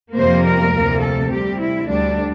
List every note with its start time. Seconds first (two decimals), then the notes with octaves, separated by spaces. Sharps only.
0.13 F2 C3 G3 A#3 C5
0.42 A#4
0.71 D2 C3 E3 A#3
0.99 A4
1.28 C3 G3 C4 G4
1.57 E4
1.85 D2 D3 G3 D4